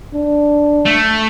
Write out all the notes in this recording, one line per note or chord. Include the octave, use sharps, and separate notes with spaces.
D4
A3